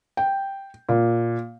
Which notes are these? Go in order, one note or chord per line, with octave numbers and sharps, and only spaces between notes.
G5
A#2